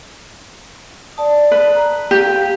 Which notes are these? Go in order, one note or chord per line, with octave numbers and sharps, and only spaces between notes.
D5 A5 D#6
B4
A#5
G4 F5